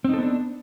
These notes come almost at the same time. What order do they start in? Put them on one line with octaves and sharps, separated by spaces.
C4 D#4 A4 B3 D4